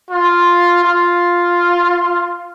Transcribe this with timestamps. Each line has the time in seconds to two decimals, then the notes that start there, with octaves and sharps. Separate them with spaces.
0.11 F4
0.84 F4